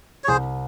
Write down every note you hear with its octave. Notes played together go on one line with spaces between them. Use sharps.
C#5
C2 G#4 C5